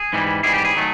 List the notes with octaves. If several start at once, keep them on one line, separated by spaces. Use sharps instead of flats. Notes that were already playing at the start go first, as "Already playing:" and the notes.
Already playing: G#4
G#2 E3 G3
G#2 E3 G3 G#4
G4
G#4
D#3 F#3 A3